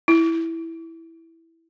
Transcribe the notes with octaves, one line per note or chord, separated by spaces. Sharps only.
E4